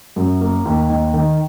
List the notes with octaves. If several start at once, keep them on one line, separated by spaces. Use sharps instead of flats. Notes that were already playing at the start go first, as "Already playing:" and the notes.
F#2
A#3
D#2
D#3
D#3